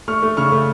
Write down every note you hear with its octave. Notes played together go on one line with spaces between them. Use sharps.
A3 C#6 F6
A3
C#3 C#6 F6
A3